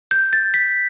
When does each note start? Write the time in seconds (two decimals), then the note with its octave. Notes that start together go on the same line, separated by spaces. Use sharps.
0.11 G6
0.33 A6
0.54 B6